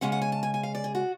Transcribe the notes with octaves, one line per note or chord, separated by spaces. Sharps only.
C#3 G#3 C#4 F#5
F#5
G#5
A5
G#5
G#5
F5
D5
G#4
F#4